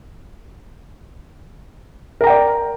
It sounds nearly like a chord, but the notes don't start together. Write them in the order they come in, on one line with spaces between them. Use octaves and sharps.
A#4 A#5 G5 D5